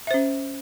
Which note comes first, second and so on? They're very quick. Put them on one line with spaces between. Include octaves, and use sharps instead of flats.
E5 C5 C#4